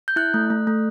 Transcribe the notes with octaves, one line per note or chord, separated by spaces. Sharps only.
G6
E4 F#6
A3
A3
A3